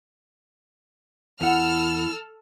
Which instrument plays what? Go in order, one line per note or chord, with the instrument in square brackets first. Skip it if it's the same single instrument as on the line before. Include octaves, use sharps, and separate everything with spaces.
[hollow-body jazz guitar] E2 F#5 [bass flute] E4 [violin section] A4 E6 F6